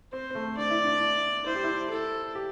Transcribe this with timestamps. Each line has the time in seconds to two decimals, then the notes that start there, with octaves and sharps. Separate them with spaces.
0.13 C4 C5
0.30 C4
0.35 A3
0.57 D4 D5
0.70 E4
0.84 D4
1.46 E4 C5
1.55 G4
1.64 E4
1.90 A4
2.35 G4